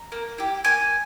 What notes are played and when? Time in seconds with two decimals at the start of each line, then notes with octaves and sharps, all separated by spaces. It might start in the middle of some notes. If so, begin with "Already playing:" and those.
Already playing: A#5
0.12 A#3
0.38 E4 G4
0.64 A#3 G#5